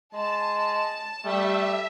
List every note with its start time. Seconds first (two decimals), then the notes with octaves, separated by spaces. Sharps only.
0.14 G#3 A5
1.25 G3 A3 E5